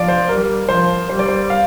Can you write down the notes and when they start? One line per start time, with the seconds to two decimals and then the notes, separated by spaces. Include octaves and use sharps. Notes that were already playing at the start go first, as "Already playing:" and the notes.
Already playing: F3 D5 F5
0.08 C5
0.29 G3 A#4
0.69 F3 C5
1.09 G3 C5
1.19 D5
1.28 C5
1.50 F5